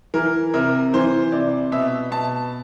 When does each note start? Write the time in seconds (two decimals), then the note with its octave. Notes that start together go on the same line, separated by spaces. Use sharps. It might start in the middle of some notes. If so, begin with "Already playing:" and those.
0.14 E3 A#4
0.54 C3 A#4
0.94 E3 C5
1.32 C3 D5
1.72 B2 E5
2.11 B2 A5